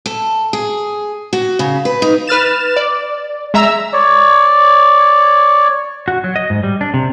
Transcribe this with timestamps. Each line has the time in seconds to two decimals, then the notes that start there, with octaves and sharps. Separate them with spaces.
0.06 A4
0.53 G#4
1.33 F#4
1.59 C#3
1.85 B4
2.02 D#4
2.27 B4 F6 A6 E7
2.76 D5
3.54 G#3 E5 A#5 E6
3.93 C#5 D5
6.08 F#4
6.24 F#3
6.36 D#5
6.50 G#2
6.63 G3
6.81 D4
6.94 C3